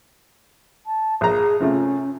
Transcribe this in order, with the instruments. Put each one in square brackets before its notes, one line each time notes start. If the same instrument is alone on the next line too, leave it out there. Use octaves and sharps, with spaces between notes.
[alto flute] A5
[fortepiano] A#1 A#5 [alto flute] G#4
[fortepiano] C3 F3 A3 [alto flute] C#4